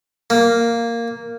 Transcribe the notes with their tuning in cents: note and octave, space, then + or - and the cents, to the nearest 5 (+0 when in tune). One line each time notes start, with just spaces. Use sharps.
A#3 -5